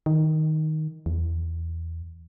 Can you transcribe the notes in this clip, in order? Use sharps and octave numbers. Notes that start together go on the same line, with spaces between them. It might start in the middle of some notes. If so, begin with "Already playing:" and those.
D#3
E2